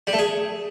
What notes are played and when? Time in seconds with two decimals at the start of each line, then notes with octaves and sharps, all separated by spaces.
0.07 G3
0.13 A3
0.19 G#4